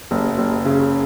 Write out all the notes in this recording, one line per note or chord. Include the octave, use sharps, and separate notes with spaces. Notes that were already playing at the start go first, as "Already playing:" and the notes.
F#1
F#1
C#3